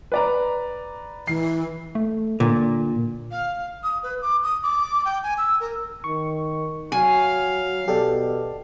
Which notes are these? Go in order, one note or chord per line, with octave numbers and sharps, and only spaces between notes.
B4 D5 A#5
E3 C7
A3
A#2 D3
F5
D#6
B4
D6
D#6
D6
G5
G#5
E6
A#4
D#3 C#6
F#3 F5 G#5
B2 G4 A4 D5